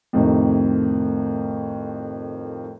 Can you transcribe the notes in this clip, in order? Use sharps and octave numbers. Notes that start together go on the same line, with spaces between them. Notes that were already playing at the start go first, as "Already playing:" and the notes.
F2 A2 C3 D#3